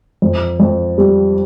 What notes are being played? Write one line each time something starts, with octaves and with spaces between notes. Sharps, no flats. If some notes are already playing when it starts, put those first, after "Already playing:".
F2
F2
G3